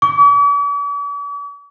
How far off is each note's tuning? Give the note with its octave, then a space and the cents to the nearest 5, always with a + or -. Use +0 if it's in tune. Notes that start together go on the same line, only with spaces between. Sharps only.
D6 -45